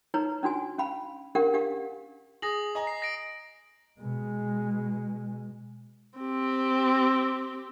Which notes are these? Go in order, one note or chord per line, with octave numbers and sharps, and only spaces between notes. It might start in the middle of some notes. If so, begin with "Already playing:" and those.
D#4 B4 C#5 A#5
C#4 D4 F#4 G#5
C#4 F5 B5
C#4 D4 G4 A#4 F5 F#5
D4 G4 F5
G#4 D#6 A#6 F#7
D#5 G#5 A#5
C7
A#6 D7
B2 G#3
C4 G4